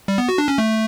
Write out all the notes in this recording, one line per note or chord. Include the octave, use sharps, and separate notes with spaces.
G3
B3
F#4
D4
C#4
A3